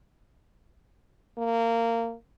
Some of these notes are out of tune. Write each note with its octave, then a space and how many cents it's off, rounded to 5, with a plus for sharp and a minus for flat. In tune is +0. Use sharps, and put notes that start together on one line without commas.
A#3 -20